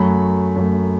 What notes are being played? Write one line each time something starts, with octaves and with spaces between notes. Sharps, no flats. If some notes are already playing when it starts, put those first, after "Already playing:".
Already playing: F#2 F#3 A3 B5
F#2 F#3 A3